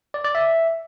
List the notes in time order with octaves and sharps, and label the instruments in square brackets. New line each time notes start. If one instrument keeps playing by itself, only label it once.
[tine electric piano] D5
D5
E5